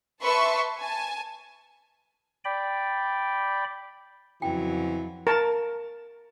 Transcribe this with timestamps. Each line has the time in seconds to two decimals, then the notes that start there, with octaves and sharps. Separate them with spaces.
0.23 B4 E5 A5 C6 C#6
0.79 G#5 A5
2.45 D5 G5 B5
4.42 F2 C#3 E3 F#3 C4 F#4 G5
5.27 A#4 A5